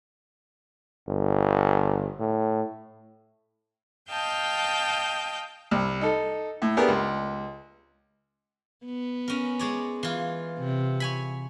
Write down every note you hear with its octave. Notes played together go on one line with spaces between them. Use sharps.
G1
A2
D#5 F5 G5 A5 G6
C2
D#4 A4
A2
B3 D4 G4 G#4 A#4
C#2
B3
C#4 A#4
G#3 C#5 D5
E3 F4
C3
C#5 G#5 B5